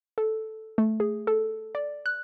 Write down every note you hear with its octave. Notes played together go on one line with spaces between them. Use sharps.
A4
A3
G#4
A4
D5
F#6